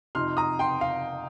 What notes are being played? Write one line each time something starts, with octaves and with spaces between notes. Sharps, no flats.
F2 C3 F3 D#4 C6 F6
A#5 D#6
G5 C6
F5